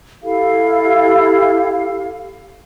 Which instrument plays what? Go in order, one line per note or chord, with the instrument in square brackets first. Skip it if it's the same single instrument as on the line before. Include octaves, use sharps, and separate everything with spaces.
[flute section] E4 G4 A4 F5